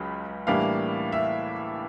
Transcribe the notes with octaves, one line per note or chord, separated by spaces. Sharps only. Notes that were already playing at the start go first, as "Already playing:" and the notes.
Already playing: C#2 C#3 F#3 B5
A2 E3 G3 A#3 D4 F5
E5